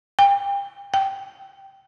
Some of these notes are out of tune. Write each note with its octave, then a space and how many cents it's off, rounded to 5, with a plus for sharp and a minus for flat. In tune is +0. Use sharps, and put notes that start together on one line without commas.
G5 +30
G5 -10